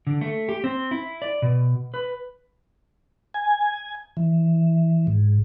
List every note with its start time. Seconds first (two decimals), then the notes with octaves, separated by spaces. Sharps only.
0.07 D3
0.21 A3
0.49 G4
0.64 C4
0.91 E4
1.22 D5
1.42 B2
1.94 B4
3.34 G#5
4.17 E3
5.07 G#2